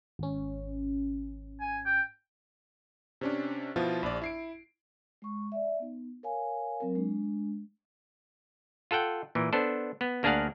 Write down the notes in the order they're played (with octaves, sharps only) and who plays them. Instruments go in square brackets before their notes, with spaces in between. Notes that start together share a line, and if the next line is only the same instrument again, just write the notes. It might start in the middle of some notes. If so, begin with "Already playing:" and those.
[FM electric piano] G#1 C#4
[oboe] G#5
G5
[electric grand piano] C3 C#4 D4
B2 F3 B3 E4 F4
A#1 D5
E4 C7 D7
[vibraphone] G#3 C#6
D5 E5
B3 D#4
A#4 C#5 F5 G#5
F#3 C4 A#4
G#3 D4
[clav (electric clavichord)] F4 A4 F#5 G5
A#2 E3
B3 D4 A4 C5
B3
D2 A#3 D4 G#4 F5 F#5